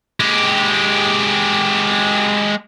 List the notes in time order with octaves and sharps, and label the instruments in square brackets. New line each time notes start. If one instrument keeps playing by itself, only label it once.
[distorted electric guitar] G#3 G4